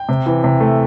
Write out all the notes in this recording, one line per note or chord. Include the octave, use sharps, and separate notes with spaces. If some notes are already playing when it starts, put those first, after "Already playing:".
Already playing: G5
C3
E3
C3
A3